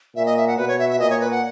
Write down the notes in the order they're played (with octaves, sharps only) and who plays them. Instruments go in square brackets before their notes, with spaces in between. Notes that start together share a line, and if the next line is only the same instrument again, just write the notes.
[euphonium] A#2 [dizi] E5
[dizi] D#5
E5
F#5
[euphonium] B2 [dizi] B4
[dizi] C#5
E5
E5
[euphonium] A#2 [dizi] D#5
[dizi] C#5
B4
F#5